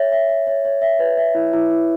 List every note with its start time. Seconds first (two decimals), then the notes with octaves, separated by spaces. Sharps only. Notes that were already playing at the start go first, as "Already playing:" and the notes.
Already playing: C#5 E5
0.12 E5
0.29 E5
0.47 C#5
0.65 C#5
0.82 E5
0.99 B4
1.17 E5
1.35 E4
1.53 E4
1.71 E4